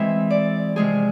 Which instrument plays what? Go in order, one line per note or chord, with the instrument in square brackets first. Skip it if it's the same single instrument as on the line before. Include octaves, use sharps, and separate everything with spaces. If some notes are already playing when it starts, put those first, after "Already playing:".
Already playing: [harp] E3 G#3 C4 E5
D5
C3 F3 G#3 C4 G#4